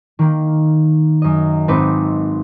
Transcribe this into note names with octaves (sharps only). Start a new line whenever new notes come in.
D#3 A#3
F#2 D#5
G#1 C4 D#4 B4 D6